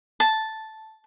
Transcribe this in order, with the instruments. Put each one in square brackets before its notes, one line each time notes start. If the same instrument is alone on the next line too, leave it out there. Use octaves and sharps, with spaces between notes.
[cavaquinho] A5